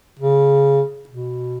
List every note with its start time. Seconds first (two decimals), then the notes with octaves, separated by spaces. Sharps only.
0.19 C#3
1.09 B2